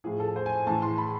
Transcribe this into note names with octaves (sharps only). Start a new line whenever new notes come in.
A2 F3 G#4
A4
C5
G#5
A2 E3 A5
C6
B5